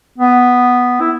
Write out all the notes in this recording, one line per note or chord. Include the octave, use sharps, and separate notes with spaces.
B3
E4